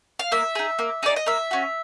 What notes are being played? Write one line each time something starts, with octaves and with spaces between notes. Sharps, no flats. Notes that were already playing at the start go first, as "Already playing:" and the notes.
F5
A#3 E5
D#4 G#4
A#3
D#4 G#4 D5
D#5
A#3 E5
C#4 F#4